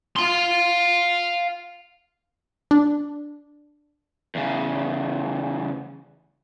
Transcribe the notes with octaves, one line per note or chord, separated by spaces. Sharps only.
F5 C6
D4
E2 C#3